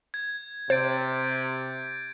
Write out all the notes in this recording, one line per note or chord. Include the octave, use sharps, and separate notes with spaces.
G#6
C3 C5 G6 A6 D7